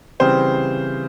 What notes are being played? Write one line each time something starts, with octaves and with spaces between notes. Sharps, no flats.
C#3 E3 G3 C4 C5